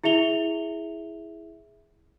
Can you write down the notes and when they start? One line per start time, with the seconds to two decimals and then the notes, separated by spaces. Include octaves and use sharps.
0.04 E4 G#4 E5 F7 G7